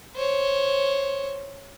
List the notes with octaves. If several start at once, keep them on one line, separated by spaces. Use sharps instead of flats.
C5 C#5